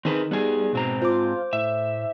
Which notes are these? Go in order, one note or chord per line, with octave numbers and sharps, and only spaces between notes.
D#3 C4 D#4 G#4 B4
G3 B3 G#4
G#2 B2 C4 A#5
F4 C5 D6
A2 E5